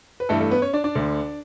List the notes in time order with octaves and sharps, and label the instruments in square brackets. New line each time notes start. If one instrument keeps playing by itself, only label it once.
[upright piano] B4
G2 E3 A3 A4
A3 A4
B3 B4
C#4 C#5
D4 D5
D4 D5
D2 D3